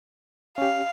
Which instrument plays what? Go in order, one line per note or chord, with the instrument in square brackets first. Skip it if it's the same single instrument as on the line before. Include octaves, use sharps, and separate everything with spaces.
[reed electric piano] C#4 G4 [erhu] F5